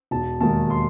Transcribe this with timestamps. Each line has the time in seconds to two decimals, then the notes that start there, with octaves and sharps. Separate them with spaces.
0.11 E1 A5
0.40 D#2 D#3 G#3 A5
0.70 C6